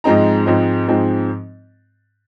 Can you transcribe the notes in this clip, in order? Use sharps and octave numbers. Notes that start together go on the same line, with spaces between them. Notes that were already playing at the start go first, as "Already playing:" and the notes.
G#2 F3 G#3 C4 D#4 A#5
G#2 F3 G#3 C4 D#4
G#2 F3 G#3 C4 D#4